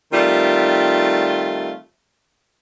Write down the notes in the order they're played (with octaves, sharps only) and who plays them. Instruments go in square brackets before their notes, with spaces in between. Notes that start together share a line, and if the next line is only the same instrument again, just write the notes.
[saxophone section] D#3 G3 A3 C4 F4